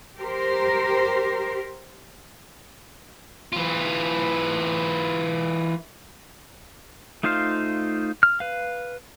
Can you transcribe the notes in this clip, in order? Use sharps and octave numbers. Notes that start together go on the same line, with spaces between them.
G4 A#4 C5
E3 F4
A3 D#4 F4 C5 F5
F6
B4 F5